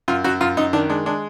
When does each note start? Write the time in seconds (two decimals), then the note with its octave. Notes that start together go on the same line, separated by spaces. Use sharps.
0.08 F#2 F4
0.24 F#2 F#4
0.41 F#2 F4
0.57 F#2 D#4
0.73 D#3 D4
0.90 G#3 D4
1.06 G#3 D4